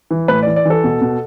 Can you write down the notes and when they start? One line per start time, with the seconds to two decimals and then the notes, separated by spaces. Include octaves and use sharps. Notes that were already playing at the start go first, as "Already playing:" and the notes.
0.11 E3
0.28 A2 B4
0.43 E3 D5
0.56 D5
0.65 E3 A4
0.84 B2
1.01 B2